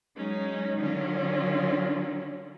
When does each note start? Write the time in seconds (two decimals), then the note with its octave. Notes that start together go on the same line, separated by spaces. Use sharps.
0.17 F#3 G#3 C#4 D#4
0.78 D3 D#3 F#3 C#4 D4 F4